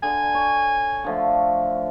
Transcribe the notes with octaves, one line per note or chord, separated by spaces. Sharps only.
D3 G#5
C#5
D3 F3 A3